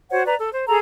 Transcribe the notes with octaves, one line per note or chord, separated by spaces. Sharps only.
F#4 C5 C#5 F#5
B4 D5 A#5
A4
C5
G#4 A4 A#5